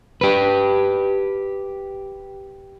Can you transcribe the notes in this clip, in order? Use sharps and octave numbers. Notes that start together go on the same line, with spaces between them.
G4 B4